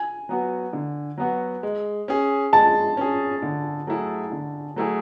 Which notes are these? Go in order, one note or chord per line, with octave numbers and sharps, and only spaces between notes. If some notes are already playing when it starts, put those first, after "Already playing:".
Already playing: G#5
F#3 B3 F#4
D3
F#3 B3 F#4
G#3
C#4 G#4
G#3 A5
C#4 G#4
D3
F#3 A3 E4 G#4
D3
F#3 A3 E4 G#4